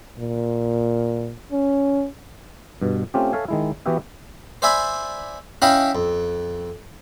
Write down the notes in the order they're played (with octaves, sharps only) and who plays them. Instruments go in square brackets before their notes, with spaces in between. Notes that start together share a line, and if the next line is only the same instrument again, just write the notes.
[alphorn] A#2
C#4
[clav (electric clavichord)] G2 B2
A3 C4 C#4 F4 G4
A4 C#5 E5 F5 G#5
D#3 G#3 E4
E3 B3 E4 F#4 G4 E5
[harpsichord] C5 D5 E5 G#5 B5
C#4 E4 D#5 F5 G5 B5
F2